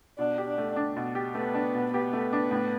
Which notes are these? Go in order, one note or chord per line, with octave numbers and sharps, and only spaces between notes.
B2 D4
G4
D4
A3
D4
B2
G4
A3 B3
D4
B2
B3 G4
A3
D4
A2